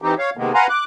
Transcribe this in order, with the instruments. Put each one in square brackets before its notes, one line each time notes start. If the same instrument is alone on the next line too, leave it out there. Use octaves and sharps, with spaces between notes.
[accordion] E3 C4 D#4 G4
C#5 F5
C3 D#3 G#3 A#3 B3
B4 F5 F#5 G#5 A#5 C6
D6 F#6